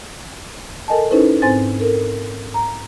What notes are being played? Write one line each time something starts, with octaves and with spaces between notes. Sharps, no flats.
A4 A#4 D#5 G#5 A5
C#4 D#4 E4 A4 B4 C5
G#2 C4 C5 G#5 A6
A4 A#4
A#5